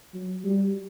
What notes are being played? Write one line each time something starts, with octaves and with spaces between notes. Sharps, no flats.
F#3
G3